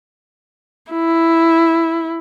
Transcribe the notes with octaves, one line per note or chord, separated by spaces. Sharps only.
E4